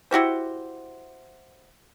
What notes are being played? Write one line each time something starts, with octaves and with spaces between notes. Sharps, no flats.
E4 F#4 G4 C5